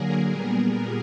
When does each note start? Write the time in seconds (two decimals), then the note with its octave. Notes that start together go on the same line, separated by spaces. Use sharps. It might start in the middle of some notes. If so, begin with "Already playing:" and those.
Already playing: D3 F#3 A#3 G#4 A#4
0.30 A#2 G3 B3
0.71 G#4 A#4